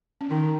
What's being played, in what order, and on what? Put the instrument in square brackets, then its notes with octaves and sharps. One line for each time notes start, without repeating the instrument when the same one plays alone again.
[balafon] C#4
[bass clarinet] D#3 [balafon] D#4